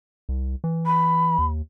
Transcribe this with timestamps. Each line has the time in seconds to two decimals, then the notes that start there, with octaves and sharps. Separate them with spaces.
0.29 C2
0.64 E3
0.86 B5
1.39 D#2